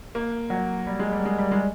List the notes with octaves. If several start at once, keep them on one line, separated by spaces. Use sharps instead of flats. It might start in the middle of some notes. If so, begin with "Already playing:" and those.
A#3
F#3
G3
G#3
G3
G#3
G3
G#3